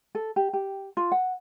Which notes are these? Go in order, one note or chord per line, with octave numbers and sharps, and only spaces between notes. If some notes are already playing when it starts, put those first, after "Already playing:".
A4
G4
G4
F4
F#5